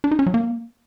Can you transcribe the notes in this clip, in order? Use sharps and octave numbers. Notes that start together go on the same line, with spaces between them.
D4
D#4
C#4
F#3
A#3